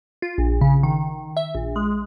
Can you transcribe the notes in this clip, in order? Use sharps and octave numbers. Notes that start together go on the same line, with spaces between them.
F4
A#1
C#3
D#3
E5
A#1
G#3